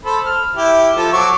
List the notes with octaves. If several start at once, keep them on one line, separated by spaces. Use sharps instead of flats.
A4 C5 B5
F6
E4 G4
F3 A4
F#3 C#6 D6